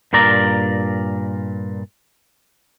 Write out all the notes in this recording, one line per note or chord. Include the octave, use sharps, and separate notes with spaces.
G2 A#2 A#4 D5 A#5